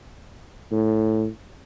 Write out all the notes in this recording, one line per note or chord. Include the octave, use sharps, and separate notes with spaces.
A2